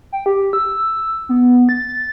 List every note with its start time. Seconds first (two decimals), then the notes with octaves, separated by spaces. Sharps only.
0.12 G5
0.26 G4
0.53 E6
1.29 B3
1.69 A6